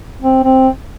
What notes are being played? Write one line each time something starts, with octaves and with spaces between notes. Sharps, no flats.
C4
C4